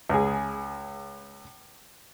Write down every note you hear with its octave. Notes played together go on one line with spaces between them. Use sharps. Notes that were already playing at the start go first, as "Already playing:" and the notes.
C#2 G#4